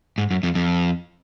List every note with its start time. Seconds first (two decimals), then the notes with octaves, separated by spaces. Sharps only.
0.18 G#2
0.31 F#2
0.43 F2
0.55 F2